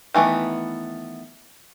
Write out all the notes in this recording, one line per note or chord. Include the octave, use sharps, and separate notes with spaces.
D#3 E3 A3 B3